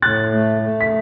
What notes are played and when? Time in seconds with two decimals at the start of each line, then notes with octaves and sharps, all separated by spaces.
0.02 A2 F#6 A6
0.32 A3
0.62 A3
0.81 B6